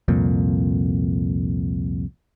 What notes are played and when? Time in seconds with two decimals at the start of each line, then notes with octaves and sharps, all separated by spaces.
0.08 C2 F2 A#2